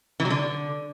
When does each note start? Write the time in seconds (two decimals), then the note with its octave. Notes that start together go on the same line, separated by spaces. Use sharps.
0.20 E3
0.25 F#3
0.30 D3